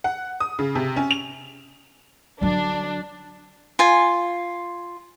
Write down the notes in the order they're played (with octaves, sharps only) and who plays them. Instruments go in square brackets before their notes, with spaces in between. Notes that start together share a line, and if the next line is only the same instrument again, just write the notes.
[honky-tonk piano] F#5
D#6
C#3
C3
C#4
F7
[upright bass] D3 F#3 [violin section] D4
[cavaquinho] F4 G#5